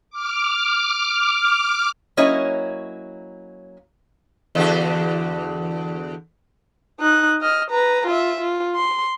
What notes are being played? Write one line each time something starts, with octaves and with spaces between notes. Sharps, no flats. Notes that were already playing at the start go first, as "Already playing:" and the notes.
D6 F6
F#3 A#3 C#4 E4 C#5 D#5
E2 D3 F#4
D#4 F#6
D#5 F6
B4 A#5
F4 E5
F4
C6